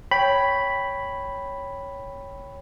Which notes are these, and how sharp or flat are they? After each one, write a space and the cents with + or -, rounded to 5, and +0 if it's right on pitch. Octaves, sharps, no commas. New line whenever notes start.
C#5 +0 G5 +0 B5 +0